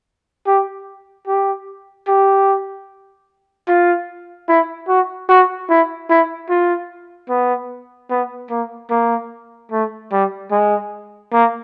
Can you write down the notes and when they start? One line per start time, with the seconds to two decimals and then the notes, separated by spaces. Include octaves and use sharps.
0.46 G4
1.27 G4
2.07 G4
3.68 F4
4.49 E4
4.88 F#4
5.29 F#4
5.69 E4
6.10 E4
6.49 F4
7.29 B3
8.10 B3
8.50 A#3
8.90 A#3
9.71 A3
10.12 G3
10.51 G#3
11.32 A#3